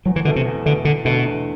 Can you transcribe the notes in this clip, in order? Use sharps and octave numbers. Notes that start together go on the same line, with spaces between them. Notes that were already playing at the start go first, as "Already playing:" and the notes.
E2 F#3
E3
B2 D3 A3
C3
E2
B2 D3 A3
E2 D3
B2 D3 A3
E2